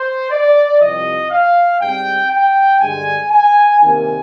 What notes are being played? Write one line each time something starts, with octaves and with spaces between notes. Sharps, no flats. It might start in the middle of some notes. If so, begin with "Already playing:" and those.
Already playing: C5
D5
C2 C3 F3 D#5
F5
G#2 G3 C4 G5
G5
G2 D3 G#3 G#5
G#5
C2 C3 D#3 G3 A#3 G#5